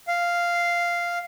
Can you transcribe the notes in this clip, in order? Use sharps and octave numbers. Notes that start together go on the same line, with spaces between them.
F5